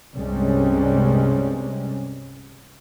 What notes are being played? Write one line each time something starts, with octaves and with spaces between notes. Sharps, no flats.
C2 G2 C3 G3 G#3 C#4